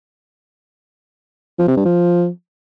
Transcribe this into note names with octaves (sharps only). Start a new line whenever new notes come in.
F3
C3
G2
F3